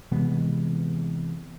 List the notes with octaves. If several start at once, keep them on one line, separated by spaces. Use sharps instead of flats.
C3 E3 G#3 B3